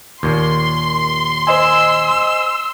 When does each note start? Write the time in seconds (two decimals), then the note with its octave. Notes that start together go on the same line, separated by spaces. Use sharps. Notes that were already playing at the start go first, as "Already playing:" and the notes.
0.23 D#2 A#2 C6
1.47 C5 D#5 G#5 E6